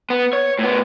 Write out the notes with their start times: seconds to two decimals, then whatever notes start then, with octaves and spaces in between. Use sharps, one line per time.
0.10 B3
0.33 C#5
0.59 A2 B3